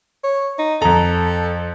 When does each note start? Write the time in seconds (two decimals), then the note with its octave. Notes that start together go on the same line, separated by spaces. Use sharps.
0.24 C#5
0.59 D#4
0.82 F2 A4 A#5